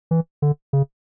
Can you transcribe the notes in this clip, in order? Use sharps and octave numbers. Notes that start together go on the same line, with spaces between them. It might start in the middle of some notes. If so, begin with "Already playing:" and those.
E3
D3
C#3